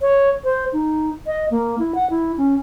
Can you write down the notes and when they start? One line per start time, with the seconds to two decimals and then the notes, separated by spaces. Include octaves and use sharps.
0.01 C#5
0.44 C5
0.73 D#4
1.27 D#5
1.51 A#3
1.79 E4
1.95 F#5
2.10 E4
2.38 C#4